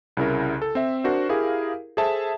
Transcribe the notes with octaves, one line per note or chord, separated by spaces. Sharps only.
C2 C#3 E4 A#4
A4
C4 E5
D4 F#4 A#4 C5
E4 G4 G#4 A#4 F5
G#4 A4 C5 E5 A5